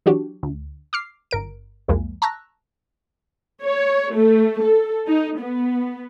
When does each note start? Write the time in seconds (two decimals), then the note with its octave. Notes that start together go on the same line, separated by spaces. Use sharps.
0.06 E3 F#3 D4 F#4 G4
0.43 D2
0.93 D6 F6 C7
1.31 G1 A#4 D7
1.88 C2 F2 F3 G#3 A#3
2.22 A5 A#5 C#6 E6 F#6 A#6
3.62 C#5
4.13 A3
4.62 A4
5.07 D#4
5.39 B3